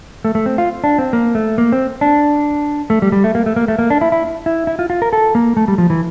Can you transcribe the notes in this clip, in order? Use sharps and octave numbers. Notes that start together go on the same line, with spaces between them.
A3
A3
C4
F4
D4
C4
A#3
A3
A#3
C4
D4
A3
G3
G3
A3
A#3
A3
A#3
A3
A#3
D4
E4
E4
E4
E4
F4
F4
A#4
A4
A#3
A3
G3
F3
E3